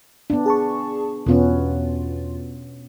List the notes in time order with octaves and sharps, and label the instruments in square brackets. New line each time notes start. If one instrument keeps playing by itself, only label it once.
[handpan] B3 D4
[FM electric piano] G#4 A5 C#6
[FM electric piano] E2 F4 [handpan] B2 B3 C#4